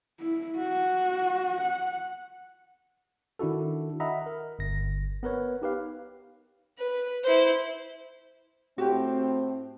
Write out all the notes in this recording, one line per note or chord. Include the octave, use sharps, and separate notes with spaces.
E4
F#4
F#5
D#3 D4 E4 F#4 A4
D#5 E5 F#5 A#5 B5
A#4
G1 A#6
B3 A#4 B4 C#5
D#4 G4 B4 F5
B4
E4 C5
A2 C4 F#4 G4